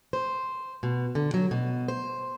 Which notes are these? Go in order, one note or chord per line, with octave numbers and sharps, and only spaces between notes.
C5
B2
D3
F#3
B2
C5